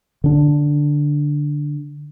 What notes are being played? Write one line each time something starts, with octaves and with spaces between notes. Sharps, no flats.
D3 D4